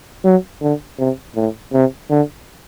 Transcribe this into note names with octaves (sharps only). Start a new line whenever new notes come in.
F#3
D3
C3
A2
C3
D3